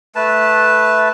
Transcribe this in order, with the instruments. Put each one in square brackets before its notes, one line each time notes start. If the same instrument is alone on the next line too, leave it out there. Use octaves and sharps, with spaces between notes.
[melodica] A3 B4 A5